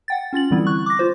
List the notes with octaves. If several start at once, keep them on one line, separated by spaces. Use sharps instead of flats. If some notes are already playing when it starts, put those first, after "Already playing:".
F#5 G5 A6
C#4 F4 A6 F#7
D3 E3 G3 B3 C4 E4
C#6 F#6
D6 A#6
F4 C5